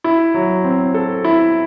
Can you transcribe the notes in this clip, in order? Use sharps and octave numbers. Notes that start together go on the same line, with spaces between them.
E4
F#3
C4
A4
E4